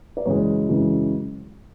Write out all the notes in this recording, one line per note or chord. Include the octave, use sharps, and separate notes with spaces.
D5
F#2 C#3 E3 G#3 C#5
F#2 C#3 E3 G#3